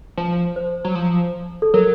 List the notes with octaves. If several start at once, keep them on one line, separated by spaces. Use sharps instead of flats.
F3
C5
F#3
F3
A4
F#3 A#4